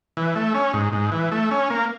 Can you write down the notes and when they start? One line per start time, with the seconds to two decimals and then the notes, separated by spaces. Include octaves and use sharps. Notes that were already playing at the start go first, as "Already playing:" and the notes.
0.17 E3
0.35 A3
0.54 C#4
0.73 G#2
0.93 G#2
1.12 E3
1.32 A3
1.51 C#4
1.70 A#3